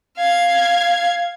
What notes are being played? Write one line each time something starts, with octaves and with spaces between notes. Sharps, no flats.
F5 G#6